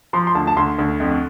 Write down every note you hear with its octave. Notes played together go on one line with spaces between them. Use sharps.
F3 C6
C6
D2 A5
A5
D2 C6
D2
F2